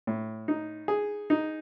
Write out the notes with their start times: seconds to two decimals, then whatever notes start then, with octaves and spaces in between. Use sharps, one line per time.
0.07 A2
0.48 D#4
0.88 G#4
1.30 D#4